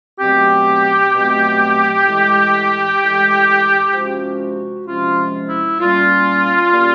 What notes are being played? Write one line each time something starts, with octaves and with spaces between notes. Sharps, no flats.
B2 F#3 A3 C4 G4
B2 F#3 A3 C4
A2 E3 G#3
A2 E3 G#3
C3 F3 G#3 C#4 F#4
C3 F3 G#3 C#4 F4
E4
A#2 G3 A#3 C#4 F4
A#2 G3 A#3 C#4